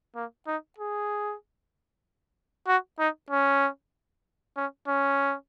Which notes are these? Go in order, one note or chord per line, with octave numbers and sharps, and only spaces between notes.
A#3
D#4
G#4
F#4
D#4
C#4
C#4
C#4